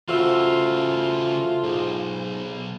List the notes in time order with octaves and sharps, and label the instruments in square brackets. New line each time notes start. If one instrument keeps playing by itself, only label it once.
[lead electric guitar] C#3 E3 [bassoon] A3 [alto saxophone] F4 [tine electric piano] F#4 C5 E6
[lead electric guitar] B1 [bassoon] G#2